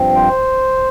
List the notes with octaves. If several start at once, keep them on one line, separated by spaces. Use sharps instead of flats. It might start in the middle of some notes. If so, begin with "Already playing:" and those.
Already playing: G2 F3 C4
C5